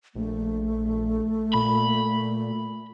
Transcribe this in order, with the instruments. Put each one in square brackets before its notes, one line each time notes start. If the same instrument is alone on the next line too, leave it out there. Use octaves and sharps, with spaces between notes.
[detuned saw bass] A#1 [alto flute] A3
[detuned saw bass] A#2 [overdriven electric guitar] B5